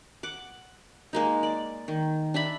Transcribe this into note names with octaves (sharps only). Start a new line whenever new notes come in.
F#5 D6
G#3 A#3 D#4
D5
D#3
D4 E5 B5